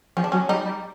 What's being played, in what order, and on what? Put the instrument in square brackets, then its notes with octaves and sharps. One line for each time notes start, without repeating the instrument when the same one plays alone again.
[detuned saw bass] F3 [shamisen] C#4
[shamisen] D4
[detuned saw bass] F#3 [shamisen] C#4
[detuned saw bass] G3 [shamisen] D#4
[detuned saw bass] G3